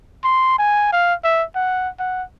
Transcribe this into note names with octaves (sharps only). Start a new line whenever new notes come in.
C6
G#5
F5
E5
F#5
F#5